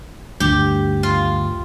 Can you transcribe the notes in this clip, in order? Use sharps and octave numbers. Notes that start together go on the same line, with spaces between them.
D2 G2 G4
F4